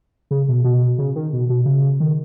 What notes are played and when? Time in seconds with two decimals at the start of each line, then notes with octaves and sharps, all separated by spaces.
0.31 C#3
0.49 B2
0.64 B2
0.98 C#3
1.16 D#3
1.33 B2
1.50 B2
1.66 C#3
2.00 D#3